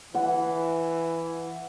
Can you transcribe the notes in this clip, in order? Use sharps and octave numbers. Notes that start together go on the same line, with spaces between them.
E3 F#5